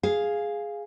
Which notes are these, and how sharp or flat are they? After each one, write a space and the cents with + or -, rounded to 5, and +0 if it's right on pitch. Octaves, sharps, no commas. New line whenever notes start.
G#4 +0 F5 +0